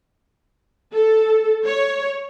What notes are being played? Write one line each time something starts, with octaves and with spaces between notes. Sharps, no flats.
A4
C#5